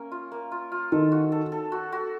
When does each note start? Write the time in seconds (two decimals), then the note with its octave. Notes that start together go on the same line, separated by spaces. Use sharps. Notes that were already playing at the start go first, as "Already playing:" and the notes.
Already playing: A#3 C#4
0.12 F4
0.32 A#3
0.52 F4
0.72 F4
0.92 D#3 A4
1.12 F#4
1.32 A4
1.52 A4
1.72 F#4
1.92 F#4